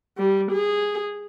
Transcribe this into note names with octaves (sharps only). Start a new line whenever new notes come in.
G3
G#4